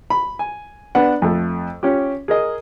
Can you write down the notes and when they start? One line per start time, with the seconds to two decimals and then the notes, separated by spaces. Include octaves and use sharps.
0.10 B5
0.39 G#5
0.95 B3 D4 F#5
1.22 F2 A3
1.83 C#4 F4 G4
2.28 G#4 A#4 D#5